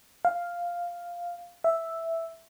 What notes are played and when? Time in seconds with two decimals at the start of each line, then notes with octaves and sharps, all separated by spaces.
0.25 F5
1.64 E5